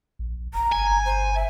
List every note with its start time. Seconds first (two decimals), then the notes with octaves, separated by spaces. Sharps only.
0.19 A#1
0.54 F1 A#5
0.72 G1 G#5
1.05 C5
1.35 E5